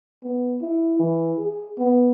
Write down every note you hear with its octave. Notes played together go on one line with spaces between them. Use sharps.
B3
E4
E3
G#4
B3